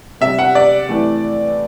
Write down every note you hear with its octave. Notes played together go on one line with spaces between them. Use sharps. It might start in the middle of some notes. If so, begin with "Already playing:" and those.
C3 G3 E5
F#5
D5
C3 E3 A3